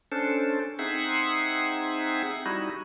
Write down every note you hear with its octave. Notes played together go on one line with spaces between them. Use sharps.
C#4 D4 A4 C5
C4 D#4 G#4 E5 F#5
G3 D#4 E4 F#4